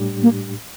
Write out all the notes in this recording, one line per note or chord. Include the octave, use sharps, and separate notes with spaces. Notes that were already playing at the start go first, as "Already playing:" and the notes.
Already playing: A2 G3 D4 G4
A#3